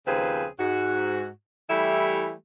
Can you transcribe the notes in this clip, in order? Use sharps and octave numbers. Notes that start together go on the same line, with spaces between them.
D#2 C#3 F3 C4 G#4 B4
G#2 F#4
E3 G3 A3 E4 G4